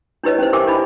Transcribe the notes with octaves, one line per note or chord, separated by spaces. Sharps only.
D4 E4 G4 B4 C#5 D#5
C#4 D#4 C5
G4 A#4 E5 G5 G#5 D6
D4 E4 D#5 G#5 B5